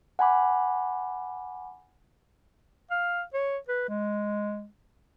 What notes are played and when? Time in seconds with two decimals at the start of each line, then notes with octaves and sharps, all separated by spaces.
0.19 F#5 G#5 B5 D6
2.91 F5
3.34 C#5
3.68 B4
3.88 G#3